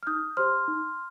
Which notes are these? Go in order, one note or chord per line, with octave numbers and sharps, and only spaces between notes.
F6
D#4 D#6 G6
G4 C5 C6 F6
D#4